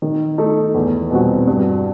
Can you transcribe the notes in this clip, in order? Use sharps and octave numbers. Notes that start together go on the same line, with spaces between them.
D#3
A3 D#4
E2
B2 G3 C4 F#4
G2